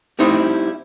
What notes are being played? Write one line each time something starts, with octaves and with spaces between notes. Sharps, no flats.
G3 A3 C4 D#4 E4